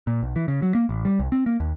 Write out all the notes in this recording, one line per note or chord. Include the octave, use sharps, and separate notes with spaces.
A#2
B1
E3
C#3
F#3
A#3
A1
G3
C2
C4
A#3
D#2